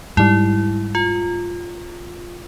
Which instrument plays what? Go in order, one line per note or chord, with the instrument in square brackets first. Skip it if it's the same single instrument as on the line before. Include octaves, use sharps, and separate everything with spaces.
[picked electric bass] G#2 G3 [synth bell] E4
[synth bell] F4